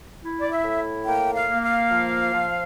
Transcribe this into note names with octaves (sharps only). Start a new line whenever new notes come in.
E4
D5
E5
A2
A#3 G5
F5
A#3
F5
F3
F3